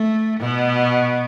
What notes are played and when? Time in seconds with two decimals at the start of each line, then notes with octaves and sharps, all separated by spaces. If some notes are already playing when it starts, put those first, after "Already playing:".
Already playing: A3
0.40 B2